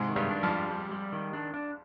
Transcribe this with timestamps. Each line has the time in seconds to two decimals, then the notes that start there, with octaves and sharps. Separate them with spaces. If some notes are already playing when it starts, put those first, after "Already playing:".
Already playing: G#2 C3 G#3
0.08 D#3
0.16 G2 G3
0.29 D4
0.43 F2 F3
0.51 G3
0.71 G3
0.92 G3
1.13 D#3
1.33 D4
1.54 D4